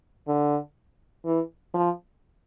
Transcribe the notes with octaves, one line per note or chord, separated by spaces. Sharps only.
D3
E3
F3